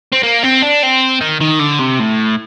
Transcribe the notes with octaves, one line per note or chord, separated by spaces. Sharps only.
C4
A#3
C4
D4
C4
D#3
D#3
D3
C3
A2